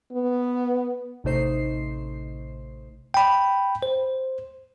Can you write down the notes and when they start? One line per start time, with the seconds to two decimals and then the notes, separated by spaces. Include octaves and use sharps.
0.12 B3
1.24 A1 C3 A3 D#4 C5 C7
3.14 G5 B5
3.83 C5